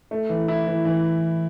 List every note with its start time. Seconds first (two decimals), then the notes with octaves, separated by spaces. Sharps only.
0.11 A3
0.29 E3
0.48 E4
0.67 E3
0.85 E3